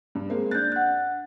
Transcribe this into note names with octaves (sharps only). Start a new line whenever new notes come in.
G2
G#3 A#3 C4
D4 F#6 G6 A6
F#5 F#6